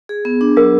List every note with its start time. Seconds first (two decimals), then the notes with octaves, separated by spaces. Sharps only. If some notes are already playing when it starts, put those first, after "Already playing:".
0.09 G#4
0.25 B3
0.41 D4
0.57 F#3 A#4